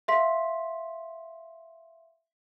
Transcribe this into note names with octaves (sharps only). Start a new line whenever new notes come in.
E5 F5 C6 B6